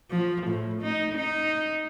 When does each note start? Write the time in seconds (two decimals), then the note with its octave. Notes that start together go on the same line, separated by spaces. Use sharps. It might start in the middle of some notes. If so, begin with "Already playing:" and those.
0.11 F3
0.47 A2
0.82 D#4
1.15 D#4